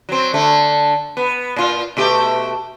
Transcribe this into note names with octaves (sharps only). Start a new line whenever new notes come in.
F#3 C4
D3 A3
B3
A#2 F4
B2 A3 G4